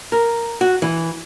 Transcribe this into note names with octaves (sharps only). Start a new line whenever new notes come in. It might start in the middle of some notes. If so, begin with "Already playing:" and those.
A#4
F#4
E3